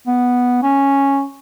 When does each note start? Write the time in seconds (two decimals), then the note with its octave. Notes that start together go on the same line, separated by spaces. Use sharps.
0.07 B3
0.63 C#4